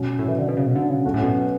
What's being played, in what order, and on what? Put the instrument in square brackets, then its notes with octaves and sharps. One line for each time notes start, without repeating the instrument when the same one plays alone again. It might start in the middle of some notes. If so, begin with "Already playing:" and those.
Already playing: [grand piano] B2 F#3 C#4 F#4
[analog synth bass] A2
E3
D3
B2
C#3
B2
D3
C#3
[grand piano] F#3 C#4 F#4 A4
[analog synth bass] A2
B2